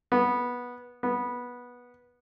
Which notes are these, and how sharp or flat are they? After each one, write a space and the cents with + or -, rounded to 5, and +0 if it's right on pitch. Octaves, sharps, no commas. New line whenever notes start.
B3 -15
B3 -15